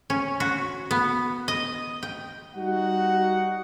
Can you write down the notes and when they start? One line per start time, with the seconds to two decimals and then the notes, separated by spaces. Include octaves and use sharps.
0.10 C#4
0.40 F#4
0.91 B3
1.48 D#5
2.03 G5
2.55 G3 D#4 F#4 F#5